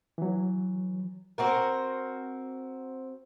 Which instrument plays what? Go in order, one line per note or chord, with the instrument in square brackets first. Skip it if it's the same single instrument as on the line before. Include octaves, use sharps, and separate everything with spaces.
[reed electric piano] E3 F#3
[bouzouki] C4 F#4 A#4